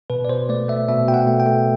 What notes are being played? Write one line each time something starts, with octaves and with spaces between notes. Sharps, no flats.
B2 B4
D5
B2 C5
A3 D5
A3 E5
B2 E5
B2 G5
F#5
A3
G5
A3